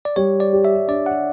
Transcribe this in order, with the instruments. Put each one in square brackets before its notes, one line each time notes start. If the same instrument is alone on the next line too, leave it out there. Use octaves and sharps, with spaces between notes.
[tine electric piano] D5
[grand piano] G3 [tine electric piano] C#5
[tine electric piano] D5
[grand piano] G4
[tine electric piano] E5
[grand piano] D4 [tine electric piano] D5
[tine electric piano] F#5